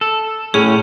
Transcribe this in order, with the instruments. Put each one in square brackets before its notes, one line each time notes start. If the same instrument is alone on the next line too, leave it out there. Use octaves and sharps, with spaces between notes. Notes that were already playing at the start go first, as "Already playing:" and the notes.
[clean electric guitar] A4
[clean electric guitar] A2 C#4 [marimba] G#4